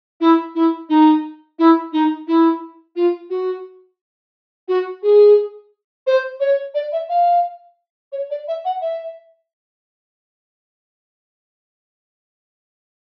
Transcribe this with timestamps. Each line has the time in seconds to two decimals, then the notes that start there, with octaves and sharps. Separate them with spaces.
0.21 E4
0.55 E4
0.89 D#4
1.59 E4
1.93 D#4
2.28 E4
2.96 F4
3.30 F#4
4.68 F#4
5.03 G#4
6.07 C5
6.40 C#5
6.74 D5
6.92 E5
7.09 F5
8.12 C#5
8.30 D5
8.48 E5
8.65 F#5
8.81 E5